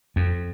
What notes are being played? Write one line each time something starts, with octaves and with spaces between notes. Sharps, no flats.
F2